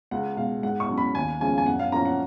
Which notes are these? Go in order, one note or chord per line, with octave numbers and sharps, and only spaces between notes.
C#2 F#5
B2 G#3 F5
G#2 F#5
C#6
F#3 C#4
B5
D#2 G#5
C#3 F3 G#3 C#4 G#5
G#5
F#2 F#5
F5
F3 A#3 C#4 A#5
F#5